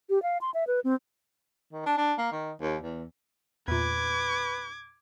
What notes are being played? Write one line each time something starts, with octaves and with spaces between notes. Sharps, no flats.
G4
F5
C6
E5
B4
C4
D#3
D4
D4
A#3
D#3
D#2
E2
E2 A#2 B4 D6 G#6